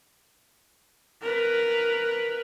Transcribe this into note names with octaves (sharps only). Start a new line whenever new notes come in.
A#4 B4